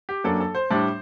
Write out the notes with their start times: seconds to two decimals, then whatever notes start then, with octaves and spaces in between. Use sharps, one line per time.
0.09 G4
0.24 F#2 F#3 A#3 D4 A4
0.40 A4
0.55 C5
0.71 A2 G3 D4